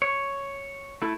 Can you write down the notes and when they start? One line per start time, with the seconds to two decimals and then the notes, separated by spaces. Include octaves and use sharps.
0.02 C#5
1.02 A3 E4 A4